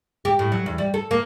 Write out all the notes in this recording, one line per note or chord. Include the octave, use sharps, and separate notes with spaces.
G4
A2
F#3
E2
G3
A4
A#3